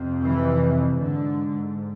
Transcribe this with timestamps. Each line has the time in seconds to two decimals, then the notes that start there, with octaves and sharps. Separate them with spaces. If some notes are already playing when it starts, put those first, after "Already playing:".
Already playing: F2 C3
0.22 E3
0.96 G#2 D3